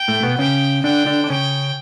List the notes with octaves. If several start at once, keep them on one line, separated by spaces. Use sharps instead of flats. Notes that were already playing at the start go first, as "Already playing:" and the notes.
Already playing: G5
A2 A3
B2 B3
C#3 C#4 G5
D3 D4 G5
D3 D4
D4
C#3 C#4 G5